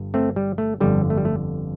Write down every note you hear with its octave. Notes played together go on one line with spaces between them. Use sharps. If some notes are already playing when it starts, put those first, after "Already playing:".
Already playing: G1 G2
A3 C4
G3
A3
G1 F2 D3 G3
A3
G3
A3